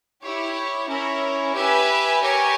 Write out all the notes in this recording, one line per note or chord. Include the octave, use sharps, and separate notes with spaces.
E4 G4 C#5
C#4 E4 A#4 C#5
G4 B4 E5 G#5
G4 A#4 C#5 G#5